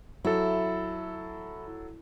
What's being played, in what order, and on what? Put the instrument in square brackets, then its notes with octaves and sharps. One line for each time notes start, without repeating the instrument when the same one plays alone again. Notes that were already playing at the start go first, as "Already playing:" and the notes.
[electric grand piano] F#3 A4 [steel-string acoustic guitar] E4